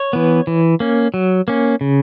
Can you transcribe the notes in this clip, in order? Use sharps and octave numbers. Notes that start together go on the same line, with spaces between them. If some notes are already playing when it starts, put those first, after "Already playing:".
Already playing: C#5
E3 B3
E3
A#3 C#4
F#3
A#3 C#4
C#3